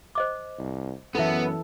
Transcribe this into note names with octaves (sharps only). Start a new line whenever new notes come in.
C5 D#5 D6
C2
F#2 E3 B3 C#4 E4 A4 E5